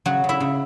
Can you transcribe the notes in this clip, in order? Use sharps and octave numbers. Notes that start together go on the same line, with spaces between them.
C#3 F#3 F#4
C#3
E4 E5
C#3